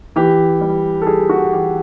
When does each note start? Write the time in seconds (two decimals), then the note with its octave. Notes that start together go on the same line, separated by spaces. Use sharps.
0.16 E3 G4
0.61 G3
1.02 A4
1.07 G3 G#4
1.29 F#4
1.53 E3 G4